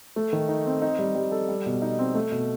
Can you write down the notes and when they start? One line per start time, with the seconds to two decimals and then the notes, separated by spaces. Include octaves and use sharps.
0.16 A3
0.33 D#3
0.49 D#4
0.66 C4
0.82 D#4
0.99 G3
1.15 G3
1.31 A4
1.49 G3
1.66 B2
1.82 D#4
1.99 C4
2.14 A3
2.32 B2